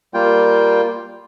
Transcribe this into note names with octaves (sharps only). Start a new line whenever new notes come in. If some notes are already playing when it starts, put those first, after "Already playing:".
G3 A#3 F4 G5